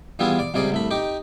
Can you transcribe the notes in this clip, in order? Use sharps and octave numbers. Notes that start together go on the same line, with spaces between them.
E3 G3 B3 E4 F4 G#4
D5
C#2 C3 G3 G#4 D5
C2 A3 B5
D#4 G4 C#6 D6